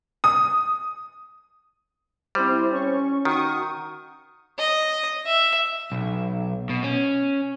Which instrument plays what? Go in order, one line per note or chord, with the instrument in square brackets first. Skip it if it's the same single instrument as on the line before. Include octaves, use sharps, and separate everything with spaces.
[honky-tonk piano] D#6
[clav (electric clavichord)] G3 [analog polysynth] C4 E4 C5
[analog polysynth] C#4 C#6
[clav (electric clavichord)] D#3 [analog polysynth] F#4 C#6 D#6
[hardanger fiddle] D#5
E5
[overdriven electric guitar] B1
B2
C#4